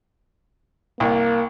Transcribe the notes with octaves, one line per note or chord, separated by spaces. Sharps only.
C2 A#3